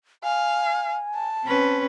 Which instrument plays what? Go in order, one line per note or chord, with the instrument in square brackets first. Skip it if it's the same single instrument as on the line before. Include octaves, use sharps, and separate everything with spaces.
[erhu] F5 [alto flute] G#5
[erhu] A5
[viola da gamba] C4 C#4 B4